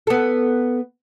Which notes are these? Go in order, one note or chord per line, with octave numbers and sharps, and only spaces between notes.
B3 A4